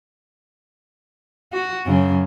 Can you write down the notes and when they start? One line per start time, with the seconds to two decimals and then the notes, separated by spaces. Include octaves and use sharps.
1.53 F#4
1.86 F#2 C#3 C#4